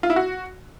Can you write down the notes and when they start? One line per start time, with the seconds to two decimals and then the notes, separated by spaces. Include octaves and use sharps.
0.03 F4
0.10 E4
0.16 F#4